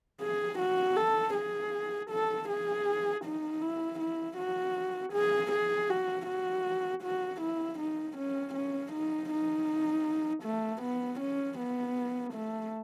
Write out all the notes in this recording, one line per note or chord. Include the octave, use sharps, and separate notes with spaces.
G#4
F#4
A4
G#4
A4
G#4
D#4
E4
E4
F#4
G#4
G#4
F#4
F#4
F#4
E4
D#4
C#4
C#4
D#4
D#4
A3
B3
C#4
B3
A3